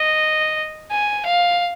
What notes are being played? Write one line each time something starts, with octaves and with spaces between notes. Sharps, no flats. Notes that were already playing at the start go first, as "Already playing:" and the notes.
Already playing: D#5
G#5
F5